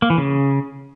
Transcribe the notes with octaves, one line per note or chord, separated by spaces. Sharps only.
A#3
E3
C#3